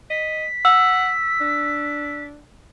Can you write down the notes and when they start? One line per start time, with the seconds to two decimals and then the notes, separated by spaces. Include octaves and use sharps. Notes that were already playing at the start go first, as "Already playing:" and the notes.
0.10 D#5 B6
0.65 F#5 E6
1.40 D4